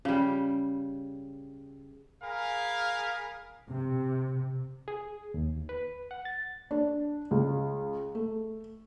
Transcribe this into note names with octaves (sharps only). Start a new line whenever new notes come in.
C#3 G3
G#4 A#4 F5 G#5 B5
C3
G#4
D#2
B4
F#5
A6
D4
C#2
A3